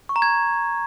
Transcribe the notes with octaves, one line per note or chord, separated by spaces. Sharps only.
C#6
A#5
G#6